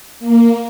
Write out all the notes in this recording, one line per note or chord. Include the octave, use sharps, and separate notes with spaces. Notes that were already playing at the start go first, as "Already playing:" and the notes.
A#3